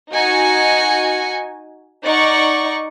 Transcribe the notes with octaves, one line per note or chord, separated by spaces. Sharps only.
D#4 F#4 G#5 C#7
D#4 D5 F#5 C#6